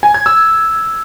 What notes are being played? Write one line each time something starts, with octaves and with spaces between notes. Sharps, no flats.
G#5
G#6
E6